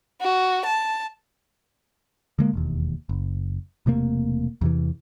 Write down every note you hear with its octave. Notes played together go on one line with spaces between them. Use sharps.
F#4
A5
D3 G#3 A#3
E1 D#2
F#1
E1 C3 A3 A#3
E2 C3 E3